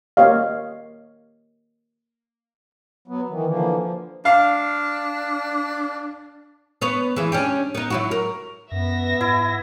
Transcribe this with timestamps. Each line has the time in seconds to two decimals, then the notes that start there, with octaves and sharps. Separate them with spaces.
0.17 A#3 G4 C#5 D#5 F5
3.08 F#3 B3
3.29 D#3 E3
3.47 D3 E3 F3 A#3
3.77 F3
4.25 D4 F5
6.81 B3 B4 C#5
7.16 E3 G#3 E4
7.32 C#4 D4 G4
7.75 B3 D#4
7.90 F#3 E4 F#4
8.11 A#4
8.71 F#2 B3 E5 A#6
9.21 G#2 E4